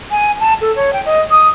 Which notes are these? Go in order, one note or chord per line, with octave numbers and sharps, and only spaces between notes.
G#5
A5
A4
C#5
G5
D#5
D#6